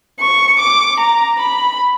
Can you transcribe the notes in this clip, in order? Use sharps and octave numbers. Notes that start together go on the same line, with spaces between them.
C#6
D6
A#5
B5